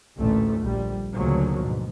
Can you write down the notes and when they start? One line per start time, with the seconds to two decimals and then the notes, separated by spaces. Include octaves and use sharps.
0.20 A1 D2 A#2 A3
0.62 A#1 G3
1.13 D2 A#2 C#3 F3 F#3 A#3
1.58 G#2 B2